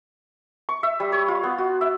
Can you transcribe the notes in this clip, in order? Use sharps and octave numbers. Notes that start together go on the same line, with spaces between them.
C#6
E5
G3
C#5
F4
B3
F#4
E5